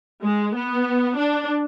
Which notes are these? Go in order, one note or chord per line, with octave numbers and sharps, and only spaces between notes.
G#3
B3
D4